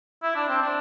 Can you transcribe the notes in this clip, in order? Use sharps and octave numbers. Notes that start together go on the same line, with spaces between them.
E4
D4
C4
D4